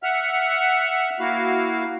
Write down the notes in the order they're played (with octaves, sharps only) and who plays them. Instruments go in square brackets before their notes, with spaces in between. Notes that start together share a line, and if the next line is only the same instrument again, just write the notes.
[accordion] E5 F#5 F6
A#3 E4 F#4 F5